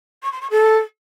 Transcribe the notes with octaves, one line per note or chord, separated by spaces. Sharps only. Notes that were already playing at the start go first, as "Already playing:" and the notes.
C#6
C6
C#6
A4